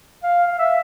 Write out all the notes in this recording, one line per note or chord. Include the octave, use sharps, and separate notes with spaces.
F5
F5
E5